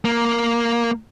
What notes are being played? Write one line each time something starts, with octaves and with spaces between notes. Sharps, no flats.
A#3